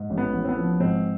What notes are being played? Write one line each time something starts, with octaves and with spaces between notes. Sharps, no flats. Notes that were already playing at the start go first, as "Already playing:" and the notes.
Already playing: G#2
A1
B3
A1
C4
B3
F3
G#2 C4